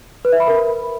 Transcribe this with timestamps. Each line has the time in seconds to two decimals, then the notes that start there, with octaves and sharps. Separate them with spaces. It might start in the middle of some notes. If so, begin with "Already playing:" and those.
0.25 B4
0.32 E5
0.40 B5
0.48 A#4